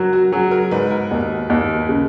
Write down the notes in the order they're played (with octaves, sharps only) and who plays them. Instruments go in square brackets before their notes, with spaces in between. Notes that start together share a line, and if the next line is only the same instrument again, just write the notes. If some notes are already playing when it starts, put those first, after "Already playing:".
Already playing: [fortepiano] F#3 [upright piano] F#4 A#4
[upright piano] F#4
[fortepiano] F#3 [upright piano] G#4
[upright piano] A#4
[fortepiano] G#2 [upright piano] B4
[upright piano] A#4
[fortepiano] D#2
D#2
C#3